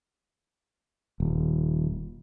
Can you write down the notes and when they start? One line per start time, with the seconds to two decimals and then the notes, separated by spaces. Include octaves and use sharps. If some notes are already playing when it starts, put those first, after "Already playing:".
1.20 D#1